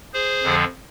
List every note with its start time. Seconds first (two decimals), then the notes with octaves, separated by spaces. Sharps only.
0.14 G#4 C5
0.43 F2 D3 F3